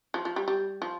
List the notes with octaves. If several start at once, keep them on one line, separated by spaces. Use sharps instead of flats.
F3
F3
G3
G3
F3